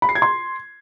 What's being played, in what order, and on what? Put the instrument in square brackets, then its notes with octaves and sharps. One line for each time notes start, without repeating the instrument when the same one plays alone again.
[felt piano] B5
C7
G#6
C6